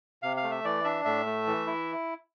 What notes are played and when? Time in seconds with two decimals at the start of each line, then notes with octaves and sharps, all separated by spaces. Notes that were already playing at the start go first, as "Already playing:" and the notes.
0.23 C3 F5
0.37 F5
0.43 A3
0.51 E5
0.64 E3 D5
0.84 D4 E5
1.05 A2 E5
1.26 A3
1.47 E3
1.67 E4